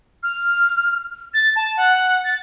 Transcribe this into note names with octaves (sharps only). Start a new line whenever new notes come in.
F6
A6
A5
F#5
A6